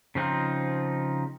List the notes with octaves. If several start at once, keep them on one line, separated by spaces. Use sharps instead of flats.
C#3 F3 C4 D#4 F4